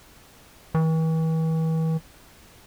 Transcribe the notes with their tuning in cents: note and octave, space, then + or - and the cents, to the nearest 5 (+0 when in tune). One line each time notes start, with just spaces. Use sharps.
E3 -40